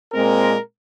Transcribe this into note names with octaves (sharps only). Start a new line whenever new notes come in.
A#2 G#3 C4 A#4